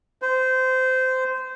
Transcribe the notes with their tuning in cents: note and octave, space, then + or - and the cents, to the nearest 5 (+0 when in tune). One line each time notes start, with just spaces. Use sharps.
C5 -20